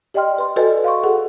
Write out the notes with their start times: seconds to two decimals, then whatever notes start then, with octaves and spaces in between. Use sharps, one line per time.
0.14 G4 D5 D#5 G5 C6 F6
0.38 B4 C6
0.56 F#4 A4 B4 D5 D#5 G#5
0.84 F5 C6 C#6
1.03 F#4 G#4 A4 B4 F#5